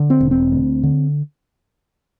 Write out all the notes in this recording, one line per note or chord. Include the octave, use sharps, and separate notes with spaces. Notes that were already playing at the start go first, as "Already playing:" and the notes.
Already playing: D3
C4
E1
C4
D2
D3